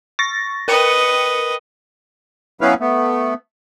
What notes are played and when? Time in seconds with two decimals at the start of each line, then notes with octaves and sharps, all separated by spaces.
0.19 C#6 A6 A#6
0.68 A#4 B4 D#5 G5 C#7
2.61 F#3 B3 C#4 E4 B4 F5
2.80 A3 B3